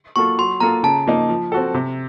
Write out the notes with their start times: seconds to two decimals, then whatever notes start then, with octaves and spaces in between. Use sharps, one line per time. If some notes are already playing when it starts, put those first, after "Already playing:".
0.16 F#3 A#3 F4 A4 C#6
0.38 F#3 C6
0.60 A#3 F4 A4 A#5
0.83 C#3 A5
1.07 F3 A#3 D#4
1.29 F3
1.52 C4 F#4 A4
1.74 C3